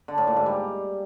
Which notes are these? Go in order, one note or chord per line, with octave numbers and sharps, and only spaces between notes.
D3
A2
A#2
G#2
G3